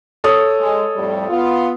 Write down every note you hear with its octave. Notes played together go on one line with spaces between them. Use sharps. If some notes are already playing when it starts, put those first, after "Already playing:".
A4 C#5 D#6
G#3
F2 A2 G3
B3 F4